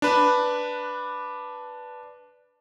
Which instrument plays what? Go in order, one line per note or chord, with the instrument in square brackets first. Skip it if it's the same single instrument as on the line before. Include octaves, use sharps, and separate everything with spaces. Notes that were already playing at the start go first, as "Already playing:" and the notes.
[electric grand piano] D4 B4